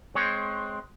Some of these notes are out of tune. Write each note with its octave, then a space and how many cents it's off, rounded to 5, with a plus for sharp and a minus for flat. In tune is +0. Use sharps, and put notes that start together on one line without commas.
G#3 +20 C4 +0 C#5 -5